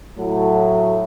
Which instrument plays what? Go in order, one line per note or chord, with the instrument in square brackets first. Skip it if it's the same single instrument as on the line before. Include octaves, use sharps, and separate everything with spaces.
[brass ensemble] A2 F#3 A3